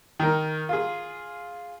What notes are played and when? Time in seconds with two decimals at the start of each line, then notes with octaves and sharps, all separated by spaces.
0.20 D#3 A#4
0.69 F4 G#4